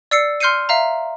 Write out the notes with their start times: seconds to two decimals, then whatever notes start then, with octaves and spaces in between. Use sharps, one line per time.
0.11 D5 E6 C7 C#7
0.40 C6 F6 G6 C7 C#7 D#7
0.69 E5 F5 A#5